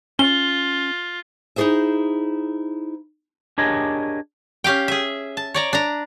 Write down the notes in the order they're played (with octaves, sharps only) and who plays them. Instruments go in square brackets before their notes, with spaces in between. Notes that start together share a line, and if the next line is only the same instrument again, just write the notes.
[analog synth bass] C#4 [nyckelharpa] F4 [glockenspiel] G7
[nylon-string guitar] D#4 E4 F#4 G#4 C5 E5
[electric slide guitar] D4 G4 G#4 A#4 C#5 D#5
[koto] C#4 G4 F5 G5
G#4 E5
A5
C#5 D5 A#5
D4 A#5